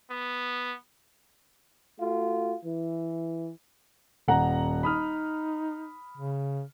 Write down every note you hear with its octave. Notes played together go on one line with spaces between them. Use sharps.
B3
A3 F4 F#4
E3
D#1 F#5 A#5
D#4 B5 D#6 F6
C#3